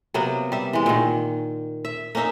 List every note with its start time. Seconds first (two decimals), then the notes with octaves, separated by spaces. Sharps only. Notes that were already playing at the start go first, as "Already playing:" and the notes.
0.14 C3 F#3 A#3 B3
0.52 G3 E5
0.73 E3 G#3
0.86 A#2 D#3
1.85 E5
2.15 A#3 C#4 D#4 E5